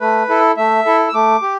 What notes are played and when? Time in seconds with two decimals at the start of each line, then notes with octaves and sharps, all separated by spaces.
0.01 A3 B4
0.29 E4 A4
0.57 A3 E5
0.85 E4 A4
1.08 E6
1.14 A3 D6
1.42 G4